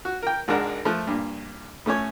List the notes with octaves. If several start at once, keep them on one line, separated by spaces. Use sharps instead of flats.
F#4
A#4 G5
G#1 G#3 D4 A#4 F#5
F3 A3 F#6
G2 A#2
A2 A3 C#4 C#5